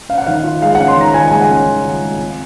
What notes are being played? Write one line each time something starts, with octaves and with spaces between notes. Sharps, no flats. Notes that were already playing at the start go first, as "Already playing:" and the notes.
C#4 F5
F#5
D#3 F5
F4
G#3 F5
C#4 F#5
C6
D#3 A#5
F4 G#5
G#3 G#5
F#5
C#4
D#3
F4
G#3
C4